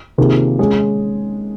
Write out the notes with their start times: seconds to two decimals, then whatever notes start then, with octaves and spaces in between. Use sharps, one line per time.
0.18 C3 D#3 A#3 F4 G#4
0.59 G#3 C#4 G#4